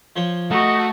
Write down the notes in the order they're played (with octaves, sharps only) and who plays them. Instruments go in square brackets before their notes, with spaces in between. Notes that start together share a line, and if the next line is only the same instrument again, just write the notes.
[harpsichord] F3 C5 C#5
[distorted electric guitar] A3 [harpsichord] D#4 [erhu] F#4 [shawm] D#5